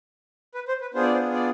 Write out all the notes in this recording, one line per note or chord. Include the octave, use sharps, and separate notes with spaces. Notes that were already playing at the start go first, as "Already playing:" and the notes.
B4
C5
B4
B3 D4 F4 G#4 C5
D5
C5
D4 D5